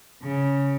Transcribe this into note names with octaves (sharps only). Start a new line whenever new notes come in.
C#3